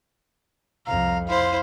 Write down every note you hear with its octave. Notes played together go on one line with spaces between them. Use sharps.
C2 F2 F5 A#5
E4 C5 F5 C6